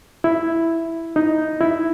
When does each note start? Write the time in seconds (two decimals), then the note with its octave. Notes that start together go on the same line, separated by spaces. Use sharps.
0.24 E4
1.16 D#4
1.61 E4